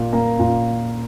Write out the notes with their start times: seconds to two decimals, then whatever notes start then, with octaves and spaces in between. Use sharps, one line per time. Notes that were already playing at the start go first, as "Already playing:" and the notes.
Already playing: A#2
0.13 A#3
0.39 A#2